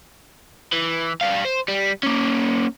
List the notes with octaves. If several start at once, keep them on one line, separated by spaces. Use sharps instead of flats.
E3
G3 F5
C5
G3
A#3 C#4